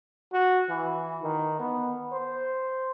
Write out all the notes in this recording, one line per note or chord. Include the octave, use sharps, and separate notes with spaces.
F#4
E3
D#3
B3
C5